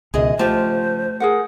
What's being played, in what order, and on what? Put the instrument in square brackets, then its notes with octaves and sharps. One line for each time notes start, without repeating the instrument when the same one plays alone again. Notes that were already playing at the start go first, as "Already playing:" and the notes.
[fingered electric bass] C#2 B2 [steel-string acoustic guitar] F#2 D#3 D#5 [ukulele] G#4
[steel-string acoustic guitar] C#3 F3 [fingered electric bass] A3 [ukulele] F4 G4 A5 [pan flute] C5
[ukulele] G#4 A#4 F#5